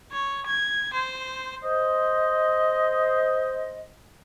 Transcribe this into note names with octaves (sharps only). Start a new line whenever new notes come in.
C#5
G#6
C5
C5 D#5